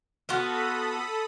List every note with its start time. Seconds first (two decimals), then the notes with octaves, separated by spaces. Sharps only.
0.29 B3 F4 F#4 A4 B5 D#6